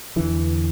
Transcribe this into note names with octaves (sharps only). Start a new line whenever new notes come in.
E2 D3 E3